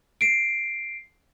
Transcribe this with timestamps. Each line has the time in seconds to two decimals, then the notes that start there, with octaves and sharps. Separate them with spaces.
0.21 C7 D7